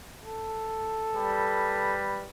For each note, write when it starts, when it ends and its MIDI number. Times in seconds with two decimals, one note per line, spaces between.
0.23 1.96 69
1.13 2.29 55
1.13 2.29 71